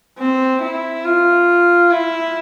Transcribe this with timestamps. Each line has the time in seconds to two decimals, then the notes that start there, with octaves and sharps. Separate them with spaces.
0.18 C4
0.62 E4
1.05 F4
1.91 E4